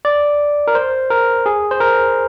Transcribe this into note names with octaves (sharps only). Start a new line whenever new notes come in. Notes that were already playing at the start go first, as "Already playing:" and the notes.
D5
A#4
C5
A#4
G#4
C5
A#4